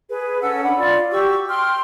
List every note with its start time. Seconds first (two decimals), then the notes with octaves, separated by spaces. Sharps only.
0.10 G#4 B4
0.41 C#4 A4 F#5 E6
0.64 D4 C#5 F#5 B5
0.77 F4 D5
1.11 F#4 G4 C#6 E6
1.48 G5 C6 F6